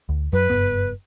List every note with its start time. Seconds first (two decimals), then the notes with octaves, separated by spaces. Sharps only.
0.09 D2
0.33 F#2 F#3 B4
0.50 F#1 G2 B3